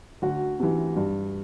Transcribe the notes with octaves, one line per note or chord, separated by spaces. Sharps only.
D2 F#4
C3 E3
G2